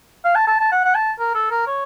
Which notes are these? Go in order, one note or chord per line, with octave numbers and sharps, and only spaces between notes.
F5
A5
A5
A5
F#5
F#5
A5
A#4
A4
A#4
C#5